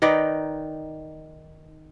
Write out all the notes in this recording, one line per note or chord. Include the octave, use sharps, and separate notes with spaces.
D#3 D#4 B4 D5